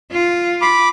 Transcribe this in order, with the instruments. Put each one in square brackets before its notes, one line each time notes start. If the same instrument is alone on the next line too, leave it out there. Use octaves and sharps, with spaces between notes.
[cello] F4
[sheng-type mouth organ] B5 D6